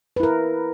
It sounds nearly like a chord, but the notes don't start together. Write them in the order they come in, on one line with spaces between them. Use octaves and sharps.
B4 E4 A#4